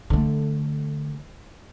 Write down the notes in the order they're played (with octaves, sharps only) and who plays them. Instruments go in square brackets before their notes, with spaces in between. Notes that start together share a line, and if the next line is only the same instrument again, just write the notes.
[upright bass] D3 A3